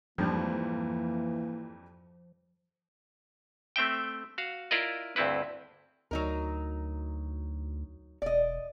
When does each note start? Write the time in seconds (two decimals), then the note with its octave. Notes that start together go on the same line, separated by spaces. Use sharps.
0.18 F2 G#2 E3 F3 G3 A#3
3.76 A3 C4 E5 G5
4.38 F#4 F5
4.71 E4 F4 A#4 D5 D#5
5.16 D2 G2 C4 E4 B4
6.11 D2 F#3 D#4 A#4
8.22 E1 D5 D#5